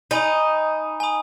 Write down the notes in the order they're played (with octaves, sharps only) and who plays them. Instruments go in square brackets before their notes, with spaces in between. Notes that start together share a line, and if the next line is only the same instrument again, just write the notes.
[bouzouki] D#4 [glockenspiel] G#5 B5 D#6
[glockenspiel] G#5 B5 D#6